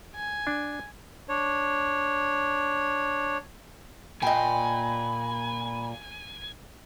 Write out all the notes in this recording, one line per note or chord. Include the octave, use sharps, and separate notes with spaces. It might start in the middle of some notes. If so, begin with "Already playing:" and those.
G#5
D4
D4 C#5
A#2 D#5 G5 G#5 B5